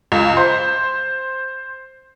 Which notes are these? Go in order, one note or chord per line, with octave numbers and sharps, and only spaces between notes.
C#2
C5